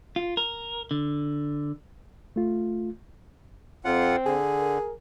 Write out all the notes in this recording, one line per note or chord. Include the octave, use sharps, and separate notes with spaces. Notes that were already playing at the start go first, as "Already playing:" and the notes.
F4
A#4
D3
A3 F4
F2 C4 F4 F#5
D3 G#4
A#4